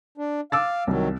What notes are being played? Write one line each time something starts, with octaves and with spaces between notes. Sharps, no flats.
D4
F5 D6 E6 A6
C2 D#3 F#3